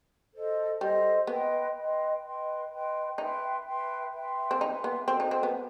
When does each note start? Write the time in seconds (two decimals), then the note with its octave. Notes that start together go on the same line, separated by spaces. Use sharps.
0.33 A4 C5 D#5
0.80 G3 A4 C5 D#5
1.27 B3 B4 D#5 G5 C6
1.76 B4 D#5 G5 C6
2.23 B4 D#5 G5 C6
2.70 B4 D#5 G5 C6
3.18 D#4 B4 E5 G5 C6
3.66 B4 E5 G5 C6
4.12 B4 E5 G5 C6
4.51 C4
4.60 D#4 B4 E5 G5 C6
4.84 B3
5.08 C4 F#4 A4 C5 D#5
5.20 D#4
5.31 C4
5.43 B3